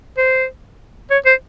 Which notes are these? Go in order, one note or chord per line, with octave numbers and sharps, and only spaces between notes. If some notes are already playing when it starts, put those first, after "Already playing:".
C5
C#5
C5